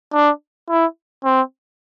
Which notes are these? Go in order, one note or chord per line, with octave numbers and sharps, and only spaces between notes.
D4
E4
C4